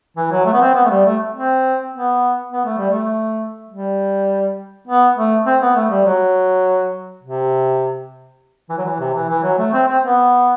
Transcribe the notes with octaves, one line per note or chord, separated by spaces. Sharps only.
E3
F#3
A3
B3
C4
B3
A3
G3
A3
C4
B3
B3
A3
G3
A3
G3
B3
A3
C4
B3
A3
G3
F#3
C3
E3
F#3
E3
C3
E3
E3
F#3
A3
C4
C4
B3